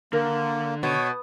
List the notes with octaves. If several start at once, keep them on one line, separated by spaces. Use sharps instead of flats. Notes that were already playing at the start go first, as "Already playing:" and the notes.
D3 A#3 A#4
B2 C#5